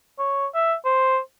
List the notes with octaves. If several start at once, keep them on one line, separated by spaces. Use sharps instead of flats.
C#5
E5
C5